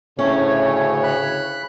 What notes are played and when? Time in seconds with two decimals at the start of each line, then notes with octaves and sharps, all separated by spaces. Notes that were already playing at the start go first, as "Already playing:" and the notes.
0.19 D2 A2 C#3 A3 C#4 C#5
1.03 B5 F#6